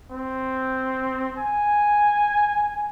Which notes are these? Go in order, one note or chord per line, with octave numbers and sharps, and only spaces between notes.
C4
G#5